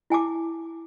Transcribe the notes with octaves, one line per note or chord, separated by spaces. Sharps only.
E4 G#5 A5 D6